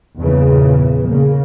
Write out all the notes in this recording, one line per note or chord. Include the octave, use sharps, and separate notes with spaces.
E2 G2 A#2 C#3 E3
C#3 A#3